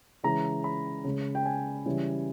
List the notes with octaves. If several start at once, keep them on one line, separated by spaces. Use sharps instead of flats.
C#3 E3 G#3 A#5
B5
C#3 G#3
G5
G#5
C#3 E3 G3